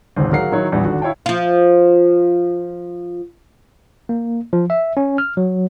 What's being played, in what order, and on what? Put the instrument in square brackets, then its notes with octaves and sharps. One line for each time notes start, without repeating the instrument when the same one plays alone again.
[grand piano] D1 G#1 C#2 C5
F#3 G#4 A#4 F5 F#5 C7
D#3 F#3 E4 C#5
A#1 E2 G3
G#1 D3 F#4
E4 C#5 F5 G5 A5
[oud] F3 F4
[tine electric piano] A#3
F3
E5
C#4
F6
F#3